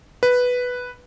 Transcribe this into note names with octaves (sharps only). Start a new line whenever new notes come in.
B4